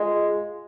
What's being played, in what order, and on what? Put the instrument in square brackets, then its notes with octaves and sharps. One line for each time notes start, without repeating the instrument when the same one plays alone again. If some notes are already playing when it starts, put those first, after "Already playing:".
Already playing: [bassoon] G#3 [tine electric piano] F4